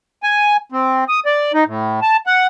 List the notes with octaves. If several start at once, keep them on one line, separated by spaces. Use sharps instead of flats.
G#5
C4
D#6
D5
D#4
A2
A5
F#5